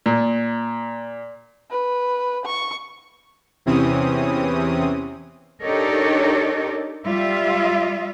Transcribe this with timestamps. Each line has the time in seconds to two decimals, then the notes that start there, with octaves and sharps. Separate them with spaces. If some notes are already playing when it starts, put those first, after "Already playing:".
0.06 A#2
1.71 B4
2.46 C#6
3.66 E2 C3 E3 C4 C#4 D#6
5.63 D4 D#4 G4 A4 A#4 C#5
7.05 G3 F4 E5